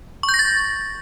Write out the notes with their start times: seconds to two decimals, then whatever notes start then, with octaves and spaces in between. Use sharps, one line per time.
0.23 C#6
0.29 G6
0.34 A#6
0.39 A6